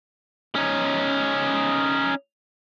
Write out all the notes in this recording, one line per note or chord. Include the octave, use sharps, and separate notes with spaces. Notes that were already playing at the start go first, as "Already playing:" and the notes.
C#4 D#4